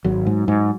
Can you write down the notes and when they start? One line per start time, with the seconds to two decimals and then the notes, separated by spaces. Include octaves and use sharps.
0.04 G#1 F#3
0.26 G#2
0.48 G#2